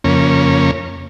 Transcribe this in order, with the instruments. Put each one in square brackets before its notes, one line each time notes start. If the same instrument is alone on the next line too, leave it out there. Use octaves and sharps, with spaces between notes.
[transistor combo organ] F2 C#3 A#3 C#4